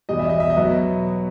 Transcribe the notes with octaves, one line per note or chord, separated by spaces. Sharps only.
E2 B2 G3 D#5
E5
D#5
E5
D#5
B2 F#3 B3